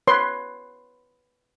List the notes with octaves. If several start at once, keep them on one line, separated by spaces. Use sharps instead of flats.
B4 C#5 C6